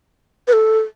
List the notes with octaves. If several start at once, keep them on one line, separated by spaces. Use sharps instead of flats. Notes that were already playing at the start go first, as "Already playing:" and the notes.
B4
A4